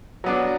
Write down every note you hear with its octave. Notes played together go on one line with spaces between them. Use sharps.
F#3 B3 D4